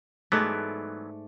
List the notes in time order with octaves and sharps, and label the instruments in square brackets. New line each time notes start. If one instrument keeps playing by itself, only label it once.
[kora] G#2 A3 D5 [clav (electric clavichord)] E3 F#3 B3